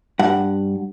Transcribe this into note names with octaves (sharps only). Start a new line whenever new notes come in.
G2 F#5